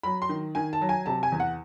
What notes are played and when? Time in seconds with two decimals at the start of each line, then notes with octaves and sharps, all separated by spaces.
0.03 F#3 B5
0.22 C6
0.29 D#3
0.55 D#3 G#5
0.73 A5
0.81 F#3
0.89 G#5
1.06 C3 A5
1.23 G#5
1.32 E2
1.40 F#5